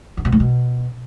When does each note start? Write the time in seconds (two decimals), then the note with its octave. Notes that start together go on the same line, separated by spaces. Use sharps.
0.17 D3
0.25 B2
0.32 A2
0.40 B2